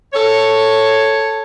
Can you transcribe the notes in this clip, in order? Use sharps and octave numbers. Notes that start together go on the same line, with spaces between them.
A4 C#5